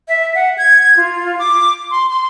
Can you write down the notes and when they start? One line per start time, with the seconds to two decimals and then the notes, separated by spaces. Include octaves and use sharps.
0.08 E5
0.35 F#5
0.58 G#6
0.97 F4
1.39 D6
1.91 C6
2.10 C6